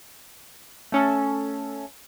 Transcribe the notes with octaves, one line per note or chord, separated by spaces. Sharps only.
A3 C#4 A4